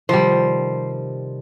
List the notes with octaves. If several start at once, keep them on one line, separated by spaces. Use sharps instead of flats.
C3 D#3 F3 G3 C5 A#6